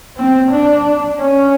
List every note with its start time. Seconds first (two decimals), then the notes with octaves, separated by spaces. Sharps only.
0.17 C4
0.51 D4
1.20 C#4